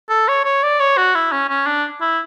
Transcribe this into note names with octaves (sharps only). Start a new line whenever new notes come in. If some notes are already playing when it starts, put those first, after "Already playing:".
A4
C#5
C#5
D5
C#5
F#4
E4
C#4
C#4
D4
E4